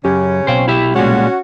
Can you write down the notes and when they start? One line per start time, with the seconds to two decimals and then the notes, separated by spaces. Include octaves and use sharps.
0.05 F#2 C#3 C#4 G4
0.47 B1 B2 C5 F5 G5
0.68 E4 G4 E5
0.96 A#2 G3 G#3 C#4 F#4